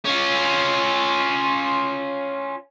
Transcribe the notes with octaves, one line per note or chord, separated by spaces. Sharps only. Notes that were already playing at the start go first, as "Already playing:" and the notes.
C#4 F4